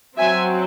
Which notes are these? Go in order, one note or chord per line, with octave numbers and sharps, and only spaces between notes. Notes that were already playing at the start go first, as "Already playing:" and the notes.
F#3 C4 E5 G#5